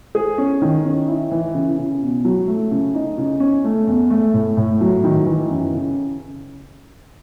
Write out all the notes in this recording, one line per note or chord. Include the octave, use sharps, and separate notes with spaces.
G#4
C#4
D#3
C#4
E4
E3
C#3
C#3
B2
F#3
A3
C#3
D#4
C#3
C#4
A3
E2
A3
A2
A2
F#3
D#3
E3
F#2
C#3